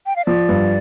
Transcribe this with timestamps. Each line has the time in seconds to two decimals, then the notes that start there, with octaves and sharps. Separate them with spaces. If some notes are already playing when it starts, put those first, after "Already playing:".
0.06 G5
0.16 F5
0.26 F3 D5
0.49 G2